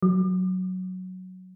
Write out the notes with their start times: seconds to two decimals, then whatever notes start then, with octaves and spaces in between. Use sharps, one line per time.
0.02 F#3